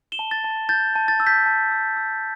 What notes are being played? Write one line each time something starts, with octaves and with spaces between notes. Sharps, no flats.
E7 G7
A5
A6
A5
G6 A6
A5
A6
E6
G6 B6
A5
E6
E6